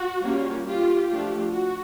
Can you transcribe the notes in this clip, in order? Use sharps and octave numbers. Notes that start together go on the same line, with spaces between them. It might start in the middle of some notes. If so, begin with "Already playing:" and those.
Already playing: F#4
G3 A#3 C#4 F4
F4 G4
F3 A3 D4 F4
F#4